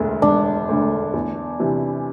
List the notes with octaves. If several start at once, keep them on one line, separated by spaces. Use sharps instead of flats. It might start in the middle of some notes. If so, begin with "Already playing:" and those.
Already playing: E1 D2 D3
E1 D4
D2 D3
E2
C3 E3